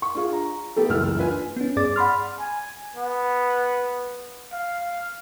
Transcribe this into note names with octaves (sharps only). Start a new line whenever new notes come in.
C#6
D4 F4 G#4 F5
A#5
A3 B3 G4 A4
F#1 C#2 G2 E3 E6 F6
D4 F4 B4 G#5
B3 C#4
G2 G#4 D5 D6 A6
F#5 B5 C6 F6
G#5
B3
F5